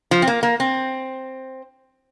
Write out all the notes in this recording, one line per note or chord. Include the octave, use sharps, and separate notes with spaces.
F3
C4
A#3
A#3
C4